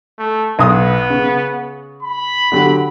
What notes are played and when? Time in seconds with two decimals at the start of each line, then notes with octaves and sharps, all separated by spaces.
0.19 A3
0.59 B1 B3 D#6
1.10 C#3
2.03 B5
2.52 D3 F#3 G4